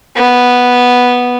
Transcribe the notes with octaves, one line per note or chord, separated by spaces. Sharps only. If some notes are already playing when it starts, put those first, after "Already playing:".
B3